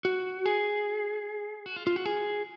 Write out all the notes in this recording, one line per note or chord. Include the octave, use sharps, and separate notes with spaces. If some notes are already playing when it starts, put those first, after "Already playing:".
F#4
G#4
F#4
F4
F4
F#4
G#4